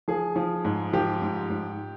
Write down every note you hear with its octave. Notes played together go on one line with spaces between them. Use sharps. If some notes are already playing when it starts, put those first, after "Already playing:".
F3 G#4
F3
G#2
F3 G4
G#2
G#2